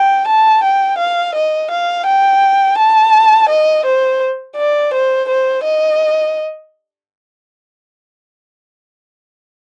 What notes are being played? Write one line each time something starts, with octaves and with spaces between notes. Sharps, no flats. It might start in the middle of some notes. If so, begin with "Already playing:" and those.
Already playing: G5
A5
G5
F5
D#5
F5
G5
A5
D#5
C5
D5
C5
C5
D#5